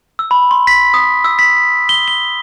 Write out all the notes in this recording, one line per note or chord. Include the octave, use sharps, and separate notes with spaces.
E6
B5
C6
B6
D#6
E6
B6
G7
G7